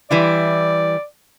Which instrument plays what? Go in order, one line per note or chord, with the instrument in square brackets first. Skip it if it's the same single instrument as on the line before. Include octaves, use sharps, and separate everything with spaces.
[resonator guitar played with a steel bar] E3 G3 E4 [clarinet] D5